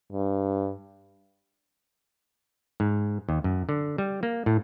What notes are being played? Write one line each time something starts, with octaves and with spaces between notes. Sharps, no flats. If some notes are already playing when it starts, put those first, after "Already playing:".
G2
G#2
D#2
F#2
D3
G3
A#3
A2